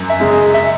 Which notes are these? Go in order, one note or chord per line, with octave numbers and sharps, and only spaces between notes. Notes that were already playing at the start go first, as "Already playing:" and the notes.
Already playing: F#2
E5
C#3 G#3
D#5
E5